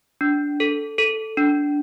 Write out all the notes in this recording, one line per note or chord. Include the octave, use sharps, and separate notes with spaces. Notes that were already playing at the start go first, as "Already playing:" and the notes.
D4
A4
A4
D4